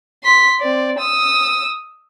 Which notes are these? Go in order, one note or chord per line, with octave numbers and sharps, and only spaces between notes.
C6 B6
C4 D5
D#6 E6